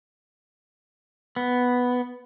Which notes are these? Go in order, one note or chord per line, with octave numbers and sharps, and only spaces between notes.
B3